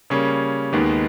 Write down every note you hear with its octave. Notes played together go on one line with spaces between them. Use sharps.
C#3 G3 A#3 C#4
D#2 D#3 G#3 B3